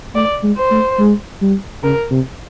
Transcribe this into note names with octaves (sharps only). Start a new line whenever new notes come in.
A3 D5
G#3
C5
A3
G#3
G3
C#3 A#4
C3